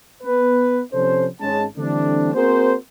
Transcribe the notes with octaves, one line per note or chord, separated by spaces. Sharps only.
B3 B4
C3 F3 C#4 A4 C5
G#1 G#3 C#4 A5
D3 E3 G3 A3 C4 D4
A#3 C4 F#4 G#4 A#4 C5